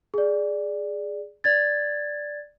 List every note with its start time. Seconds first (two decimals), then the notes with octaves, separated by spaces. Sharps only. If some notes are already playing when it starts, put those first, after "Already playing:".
0.14 G#4 D5
1.44 D5 G#6 A6